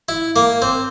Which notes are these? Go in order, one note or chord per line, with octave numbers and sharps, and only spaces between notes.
E4
A#3
C4